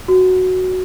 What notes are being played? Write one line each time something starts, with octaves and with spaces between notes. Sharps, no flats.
F#4